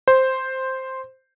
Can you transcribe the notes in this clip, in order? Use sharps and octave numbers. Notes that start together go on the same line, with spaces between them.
C5